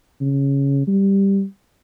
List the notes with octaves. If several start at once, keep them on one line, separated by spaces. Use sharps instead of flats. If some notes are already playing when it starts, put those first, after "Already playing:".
C#3
G3